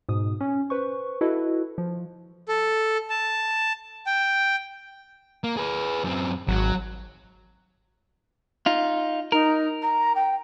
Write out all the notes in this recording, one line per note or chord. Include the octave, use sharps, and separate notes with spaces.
G#2 B2 D#6
C#4
B4 C5 C#6
E4 F#4 A4 B4 D#5
F3
A4
A5
G5
A#3
G#4 B4
F#2 C4
G#1 F#3
D#4 F4
D#4 A#4
A#5
G5